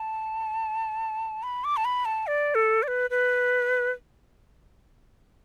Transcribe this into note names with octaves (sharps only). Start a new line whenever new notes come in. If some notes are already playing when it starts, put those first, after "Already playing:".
Already playing: A5
B5
D6
A5
B5
A5
D5
A4
D5
B4
B4